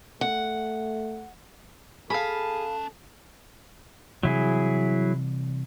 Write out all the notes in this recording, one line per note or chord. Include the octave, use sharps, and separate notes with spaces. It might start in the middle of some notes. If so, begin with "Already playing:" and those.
A3 F#5
C#4 G#4 A4 F5 A5 B5
C3 E3 F#3 G3 E4 G#4